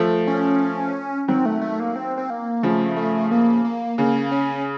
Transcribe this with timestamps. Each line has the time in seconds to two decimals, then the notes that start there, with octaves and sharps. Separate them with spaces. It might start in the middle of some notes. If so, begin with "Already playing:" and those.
Already playing: F3 A3
0.27 C#4
1.28 D#3 F#3 C4
1.46 A3
1.61 A3
1.80 A#3
1.96 C4
2.18 C4
2.30 A#3
2.63 C#3 F3 A3
2.96 A3
3.31 A#3
3.65 A#3
3.98 C#3 A#3
4.32 C#4